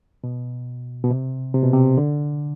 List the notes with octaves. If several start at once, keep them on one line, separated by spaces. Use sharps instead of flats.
B2
B2
C3
C3
B2
C3
D3